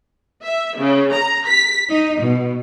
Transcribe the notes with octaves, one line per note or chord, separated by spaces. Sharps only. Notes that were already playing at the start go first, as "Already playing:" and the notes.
E5
C#3
A#5
B6
D#4
B2